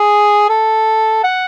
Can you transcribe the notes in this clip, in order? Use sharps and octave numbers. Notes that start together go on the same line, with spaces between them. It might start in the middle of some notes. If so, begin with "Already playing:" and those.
Already playing: G#4
A4
F#5